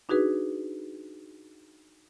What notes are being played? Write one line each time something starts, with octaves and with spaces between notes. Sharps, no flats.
D4 D#4 F#4 G#4 B4